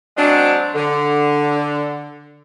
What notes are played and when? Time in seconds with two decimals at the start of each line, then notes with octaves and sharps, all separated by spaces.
0.17 F#3 G#3 C4 D4
0.75 D3